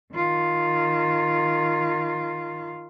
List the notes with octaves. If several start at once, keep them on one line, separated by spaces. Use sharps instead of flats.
D#3 F4